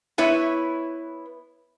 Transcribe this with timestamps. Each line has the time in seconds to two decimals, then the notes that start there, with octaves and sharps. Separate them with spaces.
0.18 B3 E4 B4 C#5